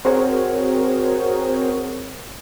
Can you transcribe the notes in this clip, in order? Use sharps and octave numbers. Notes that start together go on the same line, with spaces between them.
C4 F#4 G#4 A#4 C5 C#5